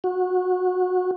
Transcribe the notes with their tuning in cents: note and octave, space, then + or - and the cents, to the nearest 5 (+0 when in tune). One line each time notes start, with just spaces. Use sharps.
F#4 -20